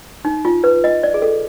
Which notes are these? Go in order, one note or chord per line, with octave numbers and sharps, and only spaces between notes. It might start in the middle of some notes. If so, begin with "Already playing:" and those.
D#4
F4
B4
D#5
D5
G#4
A4